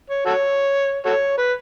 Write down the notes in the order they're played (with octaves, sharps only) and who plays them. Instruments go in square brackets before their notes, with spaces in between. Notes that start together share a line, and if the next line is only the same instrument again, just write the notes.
[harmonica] C#5
F#4 A4 C#5
F#4 A4 C#5
B4